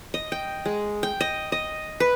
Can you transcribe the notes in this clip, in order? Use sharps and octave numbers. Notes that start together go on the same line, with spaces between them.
D#5
G5
G#3
G5
D#5
D#5
B4